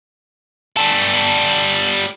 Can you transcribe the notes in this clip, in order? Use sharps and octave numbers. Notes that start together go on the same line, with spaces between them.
G3 A4